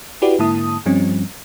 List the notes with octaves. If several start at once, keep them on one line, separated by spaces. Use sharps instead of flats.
E4 F#4 G4 B4 D5
G#2 D3 A#3 E4 A5 D#6
G2 F3 G3 C4 C#4